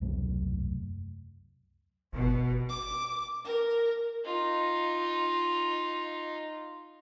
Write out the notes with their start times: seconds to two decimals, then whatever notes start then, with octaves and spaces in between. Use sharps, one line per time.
0.01 E1 C2 F#2 A3
2.13 G1 B2
2.70 D6
3.43 A#4
4.25 D#4 F4